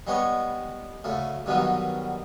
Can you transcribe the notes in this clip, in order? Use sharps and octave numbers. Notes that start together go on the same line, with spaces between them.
G3 G#3 B3 C#5 C#6
D2 C#3 A3
G2 B2 D3 D#3 F#3 G3